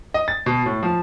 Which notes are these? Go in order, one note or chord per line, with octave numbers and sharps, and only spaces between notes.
D#5
A6
B2
A2
F3